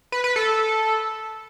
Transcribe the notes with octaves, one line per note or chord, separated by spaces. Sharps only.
B4
B4
A4